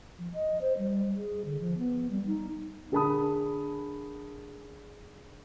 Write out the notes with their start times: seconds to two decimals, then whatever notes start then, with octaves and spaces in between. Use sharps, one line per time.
0.19 F3
0.34 D#5
0.61 C5
0.78 G3
1.16 G#4
1.45 D3
1.60 F3
1.78 B3
2.11 G3
2.27 D#4
2.92 D3 G#4 A#4 A5 B5 D#6